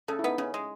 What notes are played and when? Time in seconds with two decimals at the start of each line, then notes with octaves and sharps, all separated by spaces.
0.08 C#3 A4
0.19 E4
0.24 B3 D#4
0.38 C#3 C#4
0.54 G#3